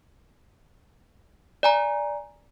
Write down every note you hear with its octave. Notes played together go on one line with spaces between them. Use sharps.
D5 G#5 A#5